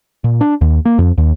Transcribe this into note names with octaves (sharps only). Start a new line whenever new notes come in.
A#2
D4
D#2
A#3
F2
D#2